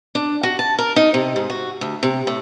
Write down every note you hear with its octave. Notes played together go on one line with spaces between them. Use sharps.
D4
F#4
A5
A#4
D#4
C3
G#2
F#4
D2
C3
A2